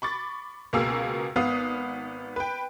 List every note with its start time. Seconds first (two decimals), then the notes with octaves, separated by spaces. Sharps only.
0.02 B5 C#6 D6 A6
0.73 C#2 B2 A#3 G#4 E6
1.36 G#1 B3 F5 D#6
2.36 B4 G5